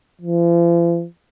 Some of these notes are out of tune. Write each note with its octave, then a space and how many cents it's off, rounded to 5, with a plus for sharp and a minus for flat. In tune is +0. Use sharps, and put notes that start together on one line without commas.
F3 -45